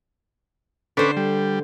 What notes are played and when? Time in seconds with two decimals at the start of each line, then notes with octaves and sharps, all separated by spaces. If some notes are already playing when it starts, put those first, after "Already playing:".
0.97 D3 C#4 B4 C5 D5
1.17 G3